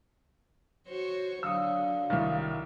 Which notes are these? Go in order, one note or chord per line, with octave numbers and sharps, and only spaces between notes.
F#4 C5 C#5
D3 F#3 F5 D#6 E6
C2 D#3